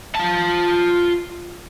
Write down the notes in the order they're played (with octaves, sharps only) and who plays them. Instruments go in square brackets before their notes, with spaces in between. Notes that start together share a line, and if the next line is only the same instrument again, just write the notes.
[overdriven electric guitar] F4 A5